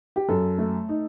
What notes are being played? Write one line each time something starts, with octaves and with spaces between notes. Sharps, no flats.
G4
F#2 A4
A3
D#4